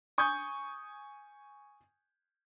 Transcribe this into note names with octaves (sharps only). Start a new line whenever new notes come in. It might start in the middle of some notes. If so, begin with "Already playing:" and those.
G#5 C#6 D#6 G6